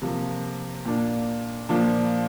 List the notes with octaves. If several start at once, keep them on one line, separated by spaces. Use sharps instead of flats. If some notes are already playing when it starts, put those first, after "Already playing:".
C3 F3 A#3
A#2 A#3 D4
A#2 F3 A#3 D4